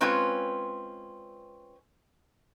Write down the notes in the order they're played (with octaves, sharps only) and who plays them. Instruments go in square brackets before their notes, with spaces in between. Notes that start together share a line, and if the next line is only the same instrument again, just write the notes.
[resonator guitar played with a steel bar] G#3 C4 C#4 F4 B4 C#5